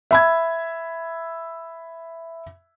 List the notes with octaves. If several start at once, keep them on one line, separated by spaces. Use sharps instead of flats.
E5 B5 G#6